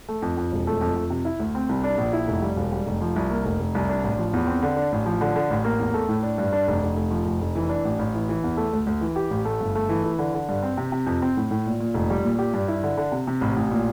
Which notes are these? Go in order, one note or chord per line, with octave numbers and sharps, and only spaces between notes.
A3
F2
F2
E1
A3
F2
F2
C3
E4
D2
C4
C2
D4
A#1
E4
F1
G3
E1
G3
F1
F3
C2
A#3
F1
F1
C2
D4
A1
F3
E2
C4
D3
D4
A1
F3
D3
D3
A1
A#3
E2
A3
A2
D4
G2
D4
F1
F1
F1
F3
F1
F1
E3
D4
A1
A1
E3
E3
E2
A3
D2
D2
E3
G4
A1
A3
G1
A3
E3
E3
D3
D3
G2
C4
C3
C3
F2
C4
A2
A2
A#2
A#2
F1
G3
A#2
G4
G2
E4
D3
D3
C3
C3
A1
A1
A#2